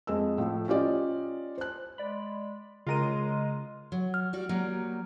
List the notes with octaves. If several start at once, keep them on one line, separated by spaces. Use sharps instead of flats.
F2 G#3 D#5 E6
A2 F3
C#4 F4 G4 D5 D#5
C5 F#6
G#3 D5 B5
C#3 G#3 F4 A#4 D#5 D#7
F#3
F6
G3 F#4
F#3 G3 A#3